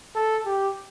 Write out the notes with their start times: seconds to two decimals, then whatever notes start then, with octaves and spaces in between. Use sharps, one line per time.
0.16 A4
0.46 G4